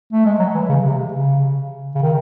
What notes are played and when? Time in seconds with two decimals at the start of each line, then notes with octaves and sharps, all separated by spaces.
0.13 A3
0.26 G#3
0.39 F#3
0.55 E3
0.69 C#3
0.85 C3
1.13 C#3
1.95 C#3
2.02 D#3